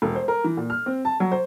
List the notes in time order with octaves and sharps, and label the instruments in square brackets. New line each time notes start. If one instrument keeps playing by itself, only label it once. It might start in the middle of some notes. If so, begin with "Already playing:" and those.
[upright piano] E1
C5
A#4
E3
A#2
F6
C4
A5
F#3
C5